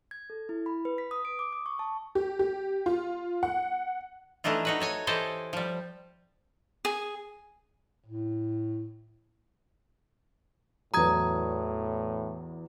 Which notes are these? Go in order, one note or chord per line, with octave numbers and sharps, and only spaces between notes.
G#6
A4
E4
B5
B4
B6
D#6
D7
D6
D#6
C#6
A5
G4
G4
F4
F#5
E3 A3 D4 D#4 F4
D#4 F#4 B4
A4 C#5 G#5
E3 G4 A4 C5 C#5 D#5
F3 G3
G#4
A2
E2 A2 F#3 A#5 D#6 G#6